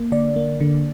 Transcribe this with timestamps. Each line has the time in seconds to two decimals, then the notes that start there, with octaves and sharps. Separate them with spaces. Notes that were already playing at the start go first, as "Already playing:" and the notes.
Already playing: A#3
0.12 D3 D5
0.36 A#3
0.61 D3